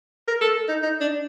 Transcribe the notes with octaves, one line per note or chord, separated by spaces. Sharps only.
A#4
A4
D#4
D#4
D4